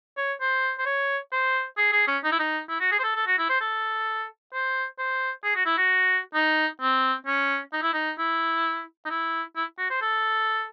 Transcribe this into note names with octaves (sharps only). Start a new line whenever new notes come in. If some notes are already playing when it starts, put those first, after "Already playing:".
C#5
C5
C5
C#5
C5
G#4
G#4
C#4
D#4
E4
D#4
E4
F#4
G#4
C5
A4
A4
F#4
E4
C5
A4
C5
C5
G#4
F#4
E4
F#4
D#4
C4
C#4
D#4
E4
D#4
E4
D#4
E4
E4
F#4
C5
A4